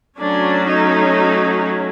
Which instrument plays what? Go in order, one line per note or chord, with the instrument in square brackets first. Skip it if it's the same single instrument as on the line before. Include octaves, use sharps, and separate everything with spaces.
[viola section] F#3 A3 C#4 D4
D#4